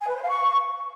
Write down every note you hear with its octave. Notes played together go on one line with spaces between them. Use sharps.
G#5
B4
C5
F5
C#6